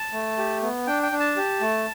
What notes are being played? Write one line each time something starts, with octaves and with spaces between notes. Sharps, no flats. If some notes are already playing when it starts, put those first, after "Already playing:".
Already playing: A5
A3
G4
B3
D4 G5
G5
D4
A5
G4
A3